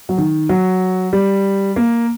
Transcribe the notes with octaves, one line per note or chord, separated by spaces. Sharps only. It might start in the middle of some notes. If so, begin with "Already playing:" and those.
F#3
D#3
F#3
G3
A#3